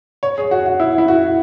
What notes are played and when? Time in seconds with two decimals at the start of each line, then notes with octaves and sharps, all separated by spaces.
0.23 C#5
0.38 G#4
0.51 F#4
0.66 F#4
0.80 E4
0.98 E4
1.08 F#4